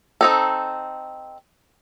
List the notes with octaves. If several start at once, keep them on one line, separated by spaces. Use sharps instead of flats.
C4 D#4 A4